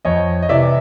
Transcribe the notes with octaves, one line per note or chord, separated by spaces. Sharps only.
F2 C#5 D#5
D#5
C3 E3 D5 E5